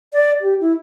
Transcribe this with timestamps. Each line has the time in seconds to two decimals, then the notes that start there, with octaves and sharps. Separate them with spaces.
0.13 D5
0.41 G4
0.61 E4